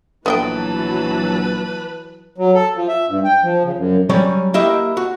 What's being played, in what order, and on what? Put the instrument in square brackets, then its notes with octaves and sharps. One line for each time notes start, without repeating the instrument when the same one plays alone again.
[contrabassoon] A#1 [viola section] E3 F#3 A5 [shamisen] B3 D#5 G5 [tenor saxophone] B4
[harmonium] F#3
A4
F3
E5
G2
G5
F3
C#3
F#2
[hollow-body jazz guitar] F#3 G3 C#4 C#5 D5
A#3 E4 G4 D#5 E5
F#4